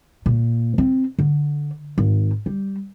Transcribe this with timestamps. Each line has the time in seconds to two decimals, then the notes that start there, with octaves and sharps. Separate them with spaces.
0.26 A#2
0.78 C4
1.19 D3
1.98 G#1
2.46 G3